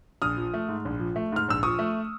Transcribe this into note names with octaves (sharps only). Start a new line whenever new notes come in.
A#1 D#6 F6
F3
A3
G#2
A#1
F3
A3
G#2 F6
A#1 E6
F3 C#6 D#6
A3